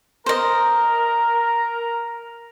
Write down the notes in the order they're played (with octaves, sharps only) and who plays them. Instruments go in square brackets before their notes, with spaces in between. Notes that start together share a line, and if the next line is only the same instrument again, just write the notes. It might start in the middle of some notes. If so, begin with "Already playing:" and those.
[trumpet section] A#4 [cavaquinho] C5 D#5 [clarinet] A#5